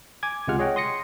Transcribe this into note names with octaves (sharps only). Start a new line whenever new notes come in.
G#5 D6 G#6
C#2 C3 G#3 F4 F#5 F6
G#4 C#5 D#5 F#5 G5
C6 D#6 A#6 C#7